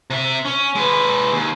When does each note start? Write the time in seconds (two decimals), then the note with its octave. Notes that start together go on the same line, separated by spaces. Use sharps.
0.10 C3 E5
0.45 C#4
0.75 G#3 B4
1.32 D#2